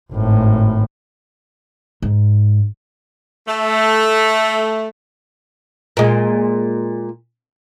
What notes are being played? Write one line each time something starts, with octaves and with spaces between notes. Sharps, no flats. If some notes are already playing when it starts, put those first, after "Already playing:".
G#1 A2
G#2
A3
A#2 G#3